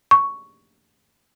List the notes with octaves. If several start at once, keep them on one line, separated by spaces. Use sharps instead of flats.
C#6